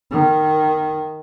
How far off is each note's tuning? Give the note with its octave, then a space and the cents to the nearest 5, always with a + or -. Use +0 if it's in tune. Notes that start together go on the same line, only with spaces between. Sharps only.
D#3 -5